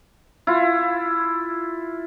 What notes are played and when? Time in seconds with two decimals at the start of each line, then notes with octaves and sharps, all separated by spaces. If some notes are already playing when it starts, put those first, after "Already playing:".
0.47 E4 F4